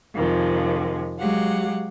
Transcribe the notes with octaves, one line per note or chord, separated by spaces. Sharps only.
F2 C3 D#3 F3 G#3
F#3 G#3 G4 F5 F#5